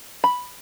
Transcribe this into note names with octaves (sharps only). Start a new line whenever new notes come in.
B5